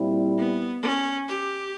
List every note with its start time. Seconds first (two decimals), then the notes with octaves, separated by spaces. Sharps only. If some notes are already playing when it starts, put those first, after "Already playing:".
Already playing: A#2 G3 C4 E4
0.37 B3
0.82 C#4
1.28 G4